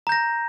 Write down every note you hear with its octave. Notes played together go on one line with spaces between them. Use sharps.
A#5 G6 A#6